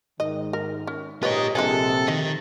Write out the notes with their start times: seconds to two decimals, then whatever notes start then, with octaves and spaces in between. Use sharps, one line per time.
0.20 G#2 D#3 D#5
0.53 A#4
0.87 C#4
1.23 G#2 F4 G4 A#4 B4 C#5 D#5
1.55 A#1 C3 G#3 D4 G#4 A4
2.08 D#3 D#4